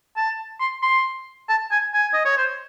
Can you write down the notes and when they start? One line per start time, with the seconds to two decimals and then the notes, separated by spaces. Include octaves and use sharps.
0.17 A5
0.60 C6
0.83 C6
1.49 A5
1.71 G#5
1.94 G#5
2.13 D#5
2.25 C#5
2.38 C5